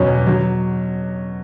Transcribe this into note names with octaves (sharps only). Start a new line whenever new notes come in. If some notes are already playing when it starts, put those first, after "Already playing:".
Already playing: E2 B2 F#3 C#4
F#3